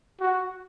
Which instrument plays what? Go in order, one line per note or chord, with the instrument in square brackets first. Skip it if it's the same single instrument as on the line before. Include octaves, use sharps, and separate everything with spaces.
[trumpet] F#4